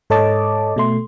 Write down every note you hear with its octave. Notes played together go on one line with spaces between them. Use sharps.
G#2 A4 C#5 D#5 A5 D6
B2 A3 C6